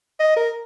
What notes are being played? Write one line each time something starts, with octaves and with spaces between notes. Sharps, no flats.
D#5
A#4